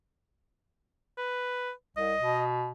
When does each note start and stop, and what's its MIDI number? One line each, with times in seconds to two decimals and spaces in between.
1.18 1.72 71
1.97 2.14 36
1.97 2.44 75
2.20 2.71 47